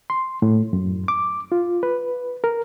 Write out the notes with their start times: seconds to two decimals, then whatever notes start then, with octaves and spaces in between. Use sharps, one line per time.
0.10 C6
0.42 A2
0.73 F#2
1.08 D6
1.52 F4
1.83 B4
2.44 A#4